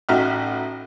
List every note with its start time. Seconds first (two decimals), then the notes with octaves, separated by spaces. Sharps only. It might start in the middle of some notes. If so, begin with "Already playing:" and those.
0.09 A1 D#4 F#4 E5 G5 F6